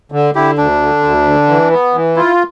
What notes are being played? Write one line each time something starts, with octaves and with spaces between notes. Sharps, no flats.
D3
D3 E4 G4
D2 D4
D3
D2
D3
E3
B3
E3
E4 F4